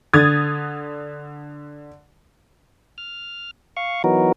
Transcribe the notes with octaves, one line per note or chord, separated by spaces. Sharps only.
D3 D#6 G#6 A6
F6
F5 C#6
E3 F#3 B3 D#4 F#4 A#4